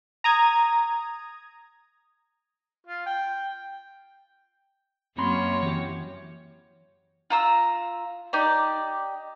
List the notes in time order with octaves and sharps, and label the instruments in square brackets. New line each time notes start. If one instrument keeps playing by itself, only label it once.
[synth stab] A#5 D#6 G#6
[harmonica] F4
G5
[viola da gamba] F#2 A#3 C#5 [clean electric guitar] C4 B5 C6
[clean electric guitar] E3 G4
[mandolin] F4 A#5 E6
D#4 G4 D5